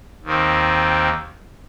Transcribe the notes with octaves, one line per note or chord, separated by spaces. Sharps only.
D#2 D#3 C4